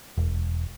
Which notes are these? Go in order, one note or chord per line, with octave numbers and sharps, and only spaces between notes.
E1